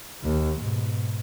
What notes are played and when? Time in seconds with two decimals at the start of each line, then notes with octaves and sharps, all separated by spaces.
0.24 D#2
0.61 G#2 B2